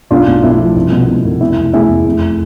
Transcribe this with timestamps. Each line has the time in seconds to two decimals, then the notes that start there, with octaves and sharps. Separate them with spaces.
0.11 B1 D4 F4
0.27 B1
0.43 B1 E4
0.59 F3
0.76 C2
0.92 B2
1.08 B2
1.25 C2
1.41 E2 E4
1.57 F1
1.73 E2 E4 G#4
1.90 E2
2.06 F1